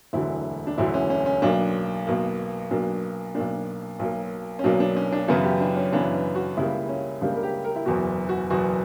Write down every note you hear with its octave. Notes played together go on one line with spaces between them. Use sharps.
E1 D2 D3 F#3 E4
D4
E1 D2 D3 F#3 E4
C#4
C#4
C#4
B1 B2 A#3 D4
B1 B2 A#3
B1 B2 A#3 D4
B1 B2 A#3 D4
B1 B2 F#3 A#3
C#4
B1 B2 F#3 A#3 D4
D4
C#4
D4
F#2 C#3 E3 B3 E4
G4
D4
C#4
F#2 C#3 E3 B3 D4
F#4
C#2 C#3 G3 A#3 E4
C#4
C#2 C#3 G3 A#3 D4
A#4
G4
A#4
E4
F#1 E2 B2 F#4
F#4
F#1 E2 B2 F#4